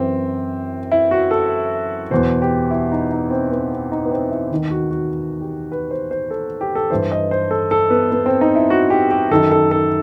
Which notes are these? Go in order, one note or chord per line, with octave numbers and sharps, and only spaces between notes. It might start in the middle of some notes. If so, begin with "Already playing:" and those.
Already playing: F#2 E3 C4
E4
F#4
A4
E2 B2 C5
G4
E4
D#4
D#4
C4
B3
C4
D#4
B3
C4
E4
D#2 D#3
F#4
F#4
G4
B4
C5
C5
A4
G4
A4
G2 E3 C5
D#5
C5
A4
A4
B3
B3
C4
D#4
E4
F#4
G4
G4
F#2 D#3 A4
A4
A4